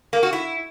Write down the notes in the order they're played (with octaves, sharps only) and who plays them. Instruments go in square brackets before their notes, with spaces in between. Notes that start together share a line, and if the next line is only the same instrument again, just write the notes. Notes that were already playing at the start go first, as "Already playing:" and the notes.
[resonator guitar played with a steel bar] A#3
F#4
E4